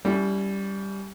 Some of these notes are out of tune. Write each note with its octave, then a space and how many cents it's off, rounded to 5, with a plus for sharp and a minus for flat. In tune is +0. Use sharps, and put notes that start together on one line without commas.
G3 +0 C#4 +30 E4 +0